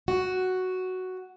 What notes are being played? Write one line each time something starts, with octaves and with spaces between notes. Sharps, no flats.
F#4